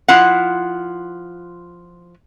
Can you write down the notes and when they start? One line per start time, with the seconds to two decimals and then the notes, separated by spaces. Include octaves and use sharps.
0.08 F3 E4 F4 F#5